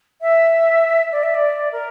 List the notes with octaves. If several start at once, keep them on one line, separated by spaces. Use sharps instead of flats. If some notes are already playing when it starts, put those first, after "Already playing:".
E5
D5
E5
D5
A#4